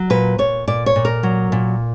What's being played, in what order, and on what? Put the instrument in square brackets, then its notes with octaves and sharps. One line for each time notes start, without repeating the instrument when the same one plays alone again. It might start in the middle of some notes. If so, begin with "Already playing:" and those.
Already playing: [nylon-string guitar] F#3
A#2 B4
A#2 C#5
A#2 D5
C#5
A#2
A#4
F#3
A#2